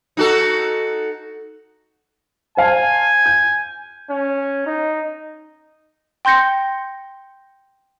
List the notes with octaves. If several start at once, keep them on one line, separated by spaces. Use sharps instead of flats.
D#4 F#4 A4
C5 F5 G#5 A5
G6
C#4
D#4
G5 C6 G6 A#6 C#7